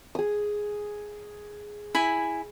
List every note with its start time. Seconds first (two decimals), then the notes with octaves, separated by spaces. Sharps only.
0.15 G#4 D#6
1.95 E4 G#5 B5